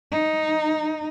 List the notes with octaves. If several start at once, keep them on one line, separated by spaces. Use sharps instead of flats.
D#4